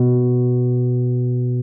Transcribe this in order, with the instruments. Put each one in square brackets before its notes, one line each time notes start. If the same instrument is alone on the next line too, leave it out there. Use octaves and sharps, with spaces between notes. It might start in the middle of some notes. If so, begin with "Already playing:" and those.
Already playing: [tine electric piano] B2